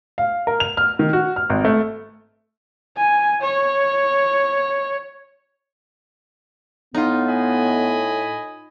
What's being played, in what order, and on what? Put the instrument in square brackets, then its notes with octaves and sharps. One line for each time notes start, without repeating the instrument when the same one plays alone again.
[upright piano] F5
A#4
F7
F6
D#3
F#4
F6
G#1
A3
[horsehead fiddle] G#5
C#5
[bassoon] A2 [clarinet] B3 [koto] D#4 F4
[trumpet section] D#5 G#5 B5